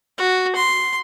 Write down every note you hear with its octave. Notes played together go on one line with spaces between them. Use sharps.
F#4
C6